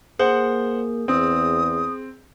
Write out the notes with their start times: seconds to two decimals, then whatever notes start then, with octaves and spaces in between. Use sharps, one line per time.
0.19 A#3 G#4 C5 F#5
1.08 E2 C4 D#6